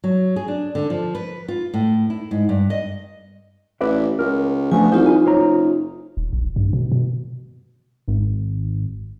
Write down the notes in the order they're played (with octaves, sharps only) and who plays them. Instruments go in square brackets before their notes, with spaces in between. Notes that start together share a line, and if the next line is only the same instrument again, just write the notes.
[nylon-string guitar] F#3
G#4
D4
D3
F3
B4
F4
A2
E4
G#2
G2
D#5
[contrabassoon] A1 [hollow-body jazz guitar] B4 D5 E5
[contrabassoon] C#2 [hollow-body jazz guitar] A#4
[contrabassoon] D2 [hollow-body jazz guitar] F3 A3 B3 [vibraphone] G#5
[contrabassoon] C2 [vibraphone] D#4 F4 [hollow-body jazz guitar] C5
[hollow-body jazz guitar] G#5
[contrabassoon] F#1 [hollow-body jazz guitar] C5 C#5 A#5
[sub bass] D#1
A#1
G2
B2
B2
[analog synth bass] G#1